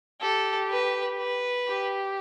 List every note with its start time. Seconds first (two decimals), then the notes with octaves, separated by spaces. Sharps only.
0.21 G4 A4
0.69 B4
1.17 B4
1.66 G4